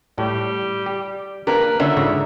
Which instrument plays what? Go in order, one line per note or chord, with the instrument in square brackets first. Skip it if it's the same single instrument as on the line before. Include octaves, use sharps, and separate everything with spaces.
[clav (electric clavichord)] A2 [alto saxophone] G3
[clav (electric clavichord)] G4
[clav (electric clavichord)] A#3 D4 G4 [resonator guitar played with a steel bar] A#4 [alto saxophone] B4
[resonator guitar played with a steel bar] D3 [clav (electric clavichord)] C#4 F4 F5 [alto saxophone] E5
[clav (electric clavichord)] G#2 C#3 A#5